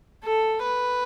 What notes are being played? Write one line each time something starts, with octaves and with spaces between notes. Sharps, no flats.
A4
B4